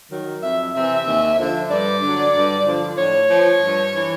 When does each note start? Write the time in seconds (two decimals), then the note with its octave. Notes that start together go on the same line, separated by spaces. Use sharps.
0.10 D#3 F#3
0.42 F2 E5
0.74 C3 E3 E5
1.06 D#2
1.39 D3 F3
1.70 G2 D5
2.02 D3 F#3
2.34 G2
2.65 D3 F3
2.97 A2 C#5
3.29 F3
3.62 G2
3.94 E3